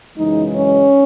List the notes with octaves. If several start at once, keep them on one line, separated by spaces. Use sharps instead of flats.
F#2 C#3 E3 G#3 D#4
C#4